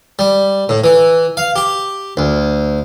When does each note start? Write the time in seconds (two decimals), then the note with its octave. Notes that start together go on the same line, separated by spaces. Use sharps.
0.19 G3
0.69 A2
0.84 E3
1.37 F5
1.56 G4
2.17 D2